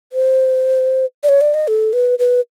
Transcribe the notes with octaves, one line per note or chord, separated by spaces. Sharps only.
C5
D5
C#5
D5
D#5
A4
B4
B4